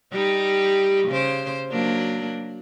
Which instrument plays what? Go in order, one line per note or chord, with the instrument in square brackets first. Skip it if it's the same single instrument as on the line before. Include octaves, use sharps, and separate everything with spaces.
[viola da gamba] G3 D#4 G4
C#3 C5
F#3 A#3 D4